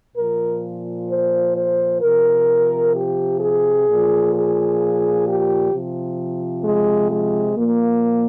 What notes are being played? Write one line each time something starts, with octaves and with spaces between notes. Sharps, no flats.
A#2 F3 A#4
C5
C5
C3 F3 A#4
G4
G#4
A#2 F3
G#4
G4
C3 F3
G#3
G#3
A#2 F3 A#3